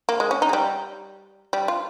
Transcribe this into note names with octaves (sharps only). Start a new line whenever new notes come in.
A#3
G#3
C#4
D#4
G#3
G3
G3
F4